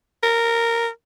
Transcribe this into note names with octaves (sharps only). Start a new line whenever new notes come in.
A#4